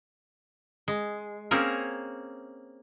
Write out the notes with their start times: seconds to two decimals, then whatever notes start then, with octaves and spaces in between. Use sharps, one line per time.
0.88 G#3
1.51 A#3 C4 C#4 G#4 A#4